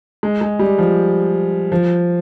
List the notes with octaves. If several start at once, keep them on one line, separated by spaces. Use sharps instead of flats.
G#3
G#3
G3
F3
F3